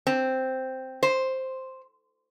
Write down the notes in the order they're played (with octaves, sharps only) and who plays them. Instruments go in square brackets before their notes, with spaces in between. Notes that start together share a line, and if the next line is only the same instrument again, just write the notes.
[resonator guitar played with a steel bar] C4
C5